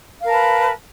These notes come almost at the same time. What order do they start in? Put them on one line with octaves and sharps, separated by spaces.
F5 A#4 A5 B4